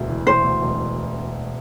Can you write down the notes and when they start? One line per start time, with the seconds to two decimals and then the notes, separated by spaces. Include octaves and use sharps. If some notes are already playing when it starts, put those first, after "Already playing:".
Already playing: E1 D2
0.09 E3
0.26 E3 C5
0.44 D2
0.62 E1